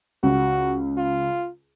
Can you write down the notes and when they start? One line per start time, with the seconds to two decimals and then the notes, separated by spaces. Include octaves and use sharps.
0.23 C#2 F#4
0.97 F4